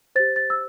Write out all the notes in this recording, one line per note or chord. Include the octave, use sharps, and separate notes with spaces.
G4 C5 A6
A6
E6